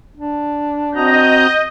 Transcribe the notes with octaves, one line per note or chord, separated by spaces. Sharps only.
D4
C4 F#4 D#5 A#5 G6